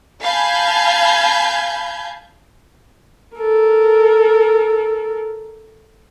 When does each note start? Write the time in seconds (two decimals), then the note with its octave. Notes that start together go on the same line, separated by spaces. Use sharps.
0.21 F5 G#5 A5 B5 G6 G#6
3.37 A4 A#4